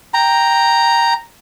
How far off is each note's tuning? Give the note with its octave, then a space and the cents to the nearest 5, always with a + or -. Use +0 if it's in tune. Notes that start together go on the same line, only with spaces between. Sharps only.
G5 +0 A#5 +0